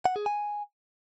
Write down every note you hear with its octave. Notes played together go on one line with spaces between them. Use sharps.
F#5
G#4
G#5